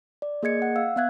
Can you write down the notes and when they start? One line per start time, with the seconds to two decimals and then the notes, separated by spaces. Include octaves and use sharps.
0.22 D5
0.43 A#3 G#4 D#5 G#6 C#7
0.62 F#5
0.76 F5 E6
0.96 B3 E5 F5 F#6 G#6